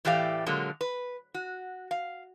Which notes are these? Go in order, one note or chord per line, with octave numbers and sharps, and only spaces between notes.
A2 E3 A3 G4 D5 F5
A#2 D3 F#3 G#3 A#3
B4
F#4
F5